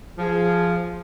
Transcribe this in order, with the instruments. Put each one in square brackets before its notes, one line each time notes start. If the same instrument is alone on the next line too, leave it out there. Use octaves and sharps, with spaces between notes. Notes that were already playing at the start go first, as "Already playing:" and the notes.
[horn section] F3 [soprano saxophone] G#4